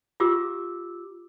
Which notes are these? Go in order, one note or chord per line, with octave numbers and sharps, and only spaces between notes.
F4 G4 D6 E6